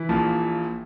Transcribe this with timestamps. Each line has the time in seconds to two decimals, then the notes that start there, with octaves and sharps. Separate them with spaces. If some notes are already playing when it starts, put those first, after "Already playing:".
Already playing: E3 E4
0.09 A#1 A#2 F3